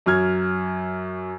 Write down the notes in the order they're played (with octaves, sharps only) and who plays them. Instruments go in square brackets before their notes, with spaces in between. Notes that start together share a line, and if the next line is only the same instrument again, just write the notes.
[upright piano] F#2 F#3 F6 G#6